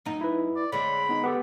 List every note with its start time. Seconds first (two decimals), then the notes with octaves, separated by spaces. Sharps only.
0.06 F#2 D#4
0.21 E4 B4
0.56 D5
0.72 D3 G#3 C4 C#5 B5
1.09 B3 D#4
1.24 B3 G4 A4